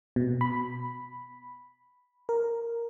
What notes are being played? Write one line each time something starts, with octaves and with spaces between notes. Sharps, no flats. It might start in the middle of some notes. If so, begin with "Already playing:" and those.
B2
B5
A#4